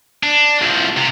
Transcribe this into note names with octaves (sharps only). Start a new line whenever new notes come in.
D4
C2 F3
C3